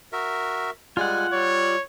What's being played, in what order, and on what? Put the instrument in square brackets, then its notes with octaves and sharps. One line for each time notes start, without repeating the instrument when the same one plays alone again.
[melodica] F#4 A#4 E5
[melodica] G3 G#3 G#5 [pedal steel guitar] F4 F#5
[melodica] G3 D5 [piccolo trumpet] C#5